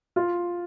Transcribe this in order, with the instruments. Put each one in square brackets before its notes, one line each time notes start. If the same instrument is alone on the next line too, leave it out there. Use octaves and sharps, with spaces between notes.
[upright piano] F4